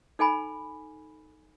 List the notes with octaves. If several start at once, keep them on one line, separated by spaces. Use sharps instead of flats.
D#4 A4 G#5 B5